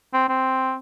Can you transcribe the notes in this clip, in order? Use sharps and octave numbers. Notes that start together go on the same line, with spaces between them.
C4
C4